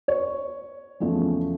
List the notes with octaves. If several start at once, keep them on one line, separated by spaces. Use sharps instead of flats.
C#5
E2 C#3 F3 A3